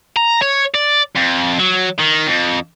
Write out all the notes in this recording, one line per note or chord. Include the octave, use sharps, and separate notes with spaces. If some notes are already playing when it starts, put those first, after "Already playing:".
A#5
C#5
D5
F2
F#3
D#3
F2